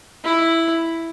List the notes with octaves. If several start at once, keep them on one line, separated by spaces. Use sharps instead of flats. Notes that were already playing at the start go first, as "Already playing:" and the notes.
E4